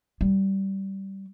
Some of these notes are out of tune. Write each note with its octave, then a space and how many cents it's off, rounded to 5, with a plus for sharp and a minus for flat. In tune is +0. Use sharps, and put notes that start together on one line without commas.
G3 -15